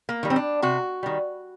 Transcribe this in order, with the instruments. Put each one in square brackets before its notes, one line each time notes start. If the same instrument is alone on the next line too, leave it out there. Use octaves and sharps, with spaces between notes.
[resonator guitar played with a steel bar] A#3
D#3 G3
C4
D4
C3 F#4
D#3 G3